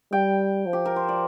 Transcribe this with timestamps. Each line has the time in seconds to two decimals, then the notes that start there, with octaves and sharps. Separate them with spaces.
0.12 G3 G5
0.66 F3
0.73 G4
0.85 A#4
0.96 C5
1.08 D5